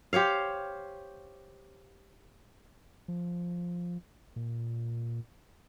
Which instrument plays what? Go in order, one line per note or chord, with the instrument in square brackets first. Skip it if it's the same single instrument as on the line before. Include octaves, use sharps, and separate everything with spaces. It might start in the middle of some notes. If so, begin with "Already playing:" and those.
[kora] G4 C5 C#5 F5
[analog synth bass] F3
A#2